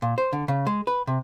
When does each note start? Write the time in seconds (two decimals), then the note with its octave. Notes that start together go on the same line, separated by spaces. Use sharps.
0.02 A#2
0.18 C5
0.33 D3
0.48 C#3
0.67 G#3
0.87 B4
1.07 C3